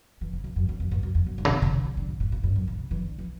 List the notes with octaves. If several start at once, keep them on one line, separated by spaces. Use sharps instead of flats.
E3
C#3
E2
F#2
E2
F#2
G2
F#2
E2
F#2
G2
C#3
B2
C#3
C#3
C#3
D3
A2
A2
A2
G2
F#2
A2
C#3
E3
D3
E3